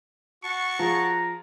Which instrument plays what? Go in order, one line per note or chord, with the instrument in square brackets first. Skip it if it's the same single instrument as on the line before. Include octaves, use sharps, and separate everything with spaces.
[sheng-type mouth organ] F#4 A5 [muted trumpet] C#6
[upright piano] F3 G#4 [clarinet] A#5